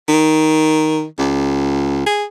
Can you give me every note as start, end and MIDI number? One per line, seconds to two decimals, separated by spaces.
0.09 1.05 51
1.19 2.06 37
2.07 2.25 68